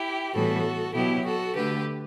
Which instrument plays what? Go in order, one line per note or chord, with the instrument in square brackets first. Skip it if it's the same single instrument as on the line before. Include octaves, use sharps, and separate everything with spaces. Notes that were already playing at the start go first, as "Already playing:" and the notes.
Already playing: [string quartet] E4 G4
A2 E3 G3 B3 F#4 A4
B2 F#3 B3 E4 G4
F#4 A4
D3 A3 G4 B4